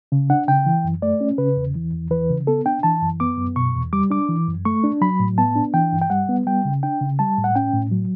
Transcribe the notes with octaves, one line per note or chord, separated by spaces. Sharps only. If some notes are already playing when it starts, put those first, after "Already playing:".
C#3
D4 F#5
C#3 G5
E3
F#2
A3 D5
C#4
C#3 B4
E2
E3
E2
E3 B4
C#3
B3 A4
D4 G5
E3 A5
F#2
B3 D6
F#2
B2 C#6
E2
G3 D6
D4 D6
E3
F#2
A3 C#6
D4
F#3 B5
A2
B3 A5
D4
E3 G5
G2
G5
G3 F#5
B3
G3 G5
C#3
D4 G5
C#3
G3 A5
A2
F#5
C#4 G5
A2
F#3